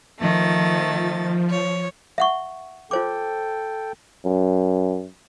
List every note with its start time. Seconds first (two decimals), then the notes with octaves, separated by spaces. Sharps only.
0.20 D#3 F3 A3 A6
1.50 C#5
2.18 E5 F#5 C#6
2.91 F4 A4 C5 G5 D6
4.25 F#2